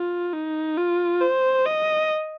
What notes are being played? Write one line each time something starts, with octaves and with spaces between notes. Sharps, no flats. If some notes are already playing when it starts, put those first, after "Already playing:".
Already playing: F4
D#4
F4
C5
D#5